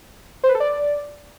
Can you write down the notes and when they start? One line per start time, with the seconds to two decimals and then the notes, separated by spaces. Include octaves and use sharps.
0.44 C5
0.49 B4
0.55 A4
0.60 D5